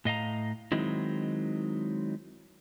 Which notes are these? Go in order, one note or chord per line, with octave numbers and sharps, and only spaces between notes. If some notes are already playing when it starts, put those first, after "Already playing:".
A2 D#5 F5 A#5
D#3 F#3 G#3 C4 D#4 E4